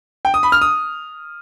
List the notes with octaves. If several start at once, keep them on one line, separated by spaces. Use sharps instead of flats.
G5
D#6
B5
F6
D#6